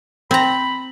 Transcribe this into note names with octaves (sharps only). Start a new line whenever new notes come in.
C4 A#5 B5